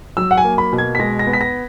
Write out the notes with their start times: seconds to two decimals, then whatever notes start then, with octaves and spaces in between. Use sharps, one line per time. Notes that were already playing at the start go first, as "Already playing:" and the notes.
0.17 F#3 E6
0.31 F#5
0.38 G#5
0.44 A#3
0.58 B5
0.73 B2
0.78 G#6
0.95 B6
0.99 G#3 A#6
1.19 A#6
1.27 B3
1.33 B6
1.41 A#6